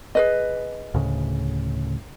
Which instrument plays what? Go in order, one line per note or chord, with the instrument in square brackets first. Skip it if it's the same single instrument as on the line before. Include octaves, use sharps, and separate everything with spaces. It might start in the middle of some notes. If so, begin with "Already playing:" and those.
[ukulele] G#4 B4 D#5
[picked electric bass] D2 A2 C#3